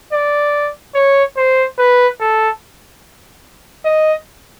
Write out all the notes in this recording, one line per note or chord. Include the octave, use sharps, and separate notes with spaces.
D5
C#5
C5
B4
A4
D#5